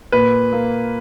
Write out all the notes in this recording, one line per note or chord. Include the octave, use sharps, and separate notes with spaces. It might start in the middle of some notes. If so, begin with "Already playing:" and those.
A#2 B4
A#3